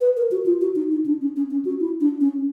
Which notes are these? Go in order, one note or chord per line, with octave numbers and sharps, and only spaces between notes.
B4
A#4
F#4
F4
F#4
D#4
D#4
D4
C#4
C#4
C#4
F#4
E4
D4
C#4